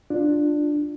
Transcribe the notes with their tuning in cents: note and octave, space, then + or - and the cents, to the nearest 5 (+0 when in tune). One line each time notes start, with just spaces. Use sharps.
D4 +10 F4 +0